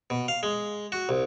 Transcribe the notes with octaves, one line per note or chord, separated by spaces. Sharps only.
B2
F5
G#3
F#4
C2